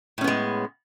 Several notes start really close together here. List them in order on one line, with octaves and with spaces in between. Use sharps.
A2 C#4 B3 G#3